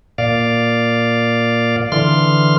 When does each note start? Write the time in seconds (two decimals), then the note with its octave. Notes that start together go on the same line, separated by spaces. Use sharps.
0.18 A#2 D5 F5
1.92 D3 E3 C6 F6